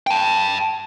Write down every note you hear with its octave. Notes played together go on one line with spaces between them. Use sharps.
G5 A5